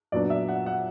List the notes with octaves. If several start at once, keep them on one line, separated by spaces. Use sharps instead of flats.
A#2 F#3 B3 D4 D5
E5
F#5
F#5